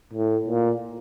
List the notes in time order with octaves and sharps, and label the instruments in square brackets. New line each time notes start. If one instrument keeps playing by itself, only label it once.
[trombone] A2
A#2